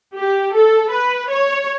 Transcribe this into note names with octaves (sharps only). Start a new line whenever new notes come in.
G4
A4
B4
C#5